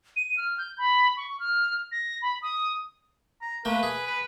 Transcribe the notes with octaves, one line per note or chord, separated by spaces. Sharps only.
D#7
F6
G6
B5
C#6
F6
A#6
B5
D#6
A#5
A3 A#3 B4 G5
G#4
B4